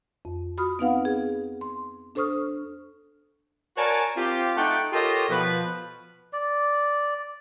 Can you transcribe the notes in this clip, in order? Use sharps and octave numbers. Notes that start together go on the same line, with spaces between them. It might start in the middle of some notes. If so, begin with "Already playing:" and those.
F2
F#4 B5 D#6 F6
B3 C4 D#4 B4 F5 F#5
G#4
C6
D4 A4 C5 C#6 D#6 F6
F#4 A#4 C#5 D5 G#5 A5
C4 F4 G4
A3 D#4 F#5 G5
F4 G4 A4 A#4 C#5 D#5
B2 F3 B4
D5